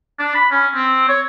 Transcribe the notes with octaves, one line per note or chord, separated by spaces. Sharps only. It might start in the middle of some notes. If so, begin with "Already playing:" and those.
D4
B5
C#4
C4
C#5